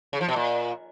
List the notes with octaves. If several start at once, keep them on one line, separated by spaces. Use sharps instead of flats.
C#3
F3
B2
A#2